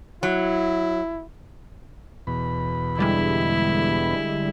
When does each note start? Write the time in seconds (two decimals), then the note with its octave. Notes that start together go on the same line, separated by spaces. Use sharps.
0.23 F#3 E4
2.27 E2 B2 B5
2.99 D3 G3 G#3 E4